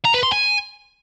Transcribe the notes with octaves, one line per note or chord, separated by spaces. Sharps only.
A#5
B4
C6
G#5